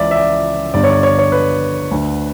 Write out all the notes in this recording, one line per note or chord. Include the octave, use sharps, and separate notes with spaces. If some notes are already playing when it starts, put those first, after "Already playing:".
Already playing: C#2 C#3 E3 D5 E5
E5
D5
G1 G2 D3 D5
C#5
D5
C#5
C#5
B4
D2 D3